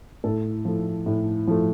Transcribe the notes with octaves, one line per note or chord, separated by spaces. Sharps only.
A2 A4
F3 A3
A2
F3 A3